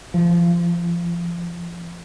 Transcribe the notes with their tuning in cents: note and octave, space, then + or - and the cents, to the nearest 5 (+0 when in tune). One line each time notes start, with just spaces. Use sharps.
F3 -25